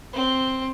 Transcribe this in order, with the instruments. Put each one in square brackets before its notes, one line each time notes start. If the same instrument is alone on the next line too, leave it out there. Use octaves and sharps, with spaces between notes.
[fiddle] C4